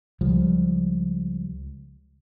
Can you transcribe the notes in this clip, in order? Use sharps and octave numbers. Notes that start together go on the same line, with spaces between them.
C#2 F3 G3